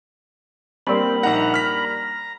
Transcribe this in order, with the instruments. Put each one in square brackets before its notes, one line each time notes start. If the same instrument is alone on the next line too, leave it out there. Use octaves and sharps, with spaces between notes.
[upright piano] G3 A#3 D4 [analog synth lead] C4 [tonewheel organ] B5
[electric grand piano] A#1 D#4 F#5 [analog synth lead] A#5
[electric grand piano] F6 B6